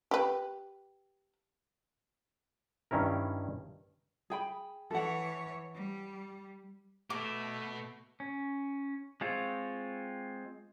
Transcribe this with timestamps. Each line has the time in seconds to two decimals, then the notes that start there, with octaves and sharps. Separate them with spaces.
0.11 G4 B4
2.91 G2 D#3 C#4 E4 A#4
4.30 G#4 G5 B5
4.91 E3 A4 C#5 F#5
5.75 G3
7.10 B2 A3 B3 D6
8.20 C#4
9.21 G#3 C4 F4 C#5